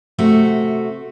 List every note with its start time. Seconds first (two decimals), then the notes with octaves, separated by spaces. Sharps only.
0.18 C3 A3 F#4